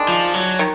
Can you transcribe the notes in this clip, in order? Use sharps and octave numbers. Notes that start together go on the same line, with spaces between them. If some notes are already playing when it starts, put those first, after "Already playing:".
Already playing: D#3 G#3 D4
F3
F#3
D#3